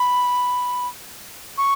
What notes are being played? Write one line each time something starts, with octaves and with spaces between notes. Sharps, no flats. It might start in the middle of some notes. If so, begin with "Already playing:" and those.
Already playing: B5
C#6